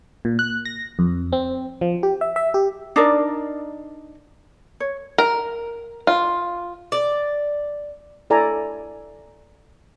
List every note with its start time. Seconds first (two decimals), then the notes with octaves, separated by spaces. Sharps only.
0.25 A#2
0.39 F#6
0.65 A#6
0.99 F2
1.32 C4
1.81 F3
2.03 G4
2.21 E5
2.36 E5
2.54 G4
2.96 D4 D#4 A#4 D5
4.80 C#5
5.18 A#4
6.07 F4
6.92 D5
8.30 E4 A4 D5 G#5 A#5